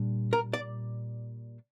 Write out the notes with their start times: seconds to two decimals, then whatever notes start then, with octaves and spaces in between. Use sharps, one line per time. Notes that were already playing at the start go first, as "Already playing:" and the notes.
Already playing: A#2 G3 D4
0.33 A#4
0.53 D5